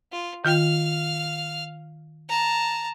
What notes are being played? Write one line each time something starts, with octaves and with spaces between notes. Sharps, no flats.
F4
D#3 F4 F5 G5 F6
A5 A#5